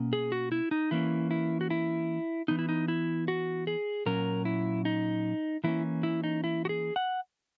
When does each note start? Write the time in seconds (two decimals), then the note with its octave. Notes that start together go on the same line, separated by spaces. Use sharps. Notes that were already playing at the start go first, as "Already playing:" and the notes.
Already playing: B2 A#3 C#4
0.13 G#4
0.32 F#4
0.52 E4
0.71 D#4
0.91 E3 A#3 C#4 E4
1.31 E4
1.61 F#4
1.70 E4
2.48 E3 B3 D#4
2.59 E4
2.69 D#4
2.88 E4
3.28 F#4
3.67 G#4
4.06 A#2 F#3 C#4 A#4
4.45 E4
4.85 D#4
5.64 E3 A#3 C#4 E4
6.03 E4
6.24 D#4
6.44 E4
6.65 F#4
6.69 G#4
6.96 F#5